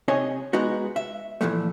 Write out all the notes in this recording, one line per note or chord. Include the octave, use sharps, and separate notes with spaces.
C3 D#4 C#5 D#5 G#5
G#3 B3 D#4 F#4
E5
A#2 D3 E3 F3 A3